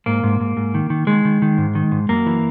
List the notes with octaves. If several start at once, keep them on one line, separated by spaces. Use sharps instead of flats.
G#2 A#3
G#2
G#2
G#2
D#3
D#3
D#3 G#3
D#3
D#3
G#2
D#3
G#2
F#2 A#3
E3